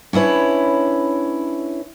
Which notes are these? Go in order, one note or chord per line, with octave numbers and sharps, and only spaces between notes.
C#4 D4 E4 B4 C#5